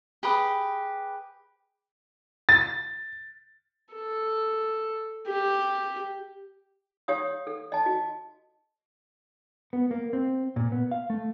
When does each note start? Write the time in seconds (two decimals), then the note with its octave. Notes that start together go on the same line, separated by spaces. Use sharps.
0.23 G4 G#4 B4 D#6
2.49 A6
3.94 A4
5.28 G4
7.08 G4 C#5 F5 D#6
7.47 A4
7.72 D#5 A5
7.86 F#4
9.73 B3
9.91 A#3
10.13 C4
10.56 A#2
10.72 B3
10.91 F5
11.10 A3